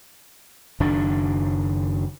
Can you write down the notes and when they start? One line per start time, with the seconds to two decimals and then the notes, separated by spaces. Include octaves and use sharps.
0.80 F#1 F#2 D#3 D4